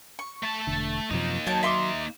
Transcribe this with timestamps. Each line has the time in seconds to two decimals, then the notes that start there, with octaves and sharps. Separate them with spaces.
0.19 C#6
0.43 A3 A5
0.67 E1 D3
1.11 F#2 C3 F3 A#3 D#4
1.47 F#3 C#5 G5 A5
1.63 E5 C6 D6